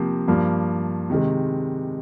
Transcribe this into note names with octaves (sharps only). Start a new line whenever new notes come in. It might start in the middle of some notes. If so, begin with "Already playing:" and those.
Already playing: C3 F3 A#3
G2 F3 A#3
C3 D#3 G#3